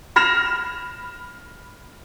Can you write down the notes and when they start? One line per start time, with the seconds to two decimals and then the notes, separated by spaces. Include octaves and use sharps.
0.16 B5 F6 A#6 E7 F7